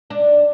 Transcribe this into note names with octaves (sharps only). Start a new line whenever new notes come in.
D4